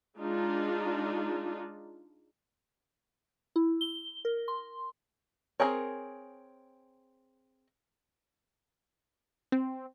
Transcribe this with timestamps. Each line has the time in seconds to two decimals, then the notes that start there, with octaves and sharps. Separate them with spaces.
0.19 G#3 D4 D#4 F4
3.56 E4
3.81 G7
4.25 A#4
4.48 C6
5.60 C4 D4 G#4 A#4 C#5
9.52 C4